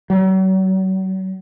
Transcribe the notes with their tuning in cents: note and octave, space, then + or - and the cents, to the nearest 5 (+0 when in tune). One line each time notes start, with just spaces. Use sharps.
F#3 +40